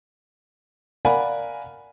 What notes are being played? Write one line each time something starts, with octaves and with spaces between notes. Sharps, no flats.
A#4 D5 F5 F#5 G#5 B5